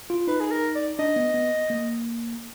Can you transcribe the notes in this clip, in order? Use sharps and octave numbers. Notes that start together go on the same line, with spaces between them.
F4
D#4 B4
G#4
A#4
D5
D4 D#5
B3
B3
A#3